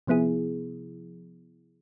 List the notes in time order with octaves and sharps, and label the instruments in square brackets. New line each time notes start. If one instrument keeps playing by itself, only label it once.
[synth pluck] C3 F3 B3 E4 G#4